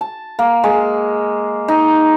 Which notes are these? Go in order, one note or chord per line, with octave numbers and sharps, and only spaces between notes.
A5
A#3
G#3
D#4